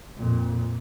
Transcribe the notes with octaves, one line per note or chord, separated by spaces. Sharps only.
F2 A#2